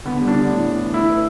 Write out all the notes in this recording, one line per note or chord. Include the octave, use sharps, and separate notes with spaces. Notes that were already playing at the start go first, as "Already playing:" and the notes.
D3 B3
G3
D4
D3
A2
E3
E3
A3 E4
B4